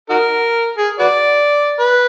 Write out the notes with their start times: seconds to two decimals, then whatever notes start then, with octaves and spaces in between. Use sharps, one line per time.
0.10 D#4 F#4 A#4
0.78 G#4
0.99 F#4 B4 D5
1.79 B4